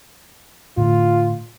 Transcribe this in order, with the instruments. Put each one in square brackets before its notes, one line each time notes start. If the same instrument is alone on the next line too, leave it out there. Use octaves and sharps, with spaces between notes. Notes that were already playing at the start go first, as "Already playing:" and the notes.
[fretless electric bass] A2 D3 [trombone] F4